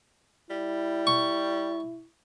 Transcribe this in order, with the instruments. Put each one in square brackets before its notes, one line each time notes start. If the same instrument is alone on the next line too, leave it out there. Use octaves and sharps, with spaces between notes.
[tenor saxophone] G3 [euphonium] E4
[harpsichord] C#6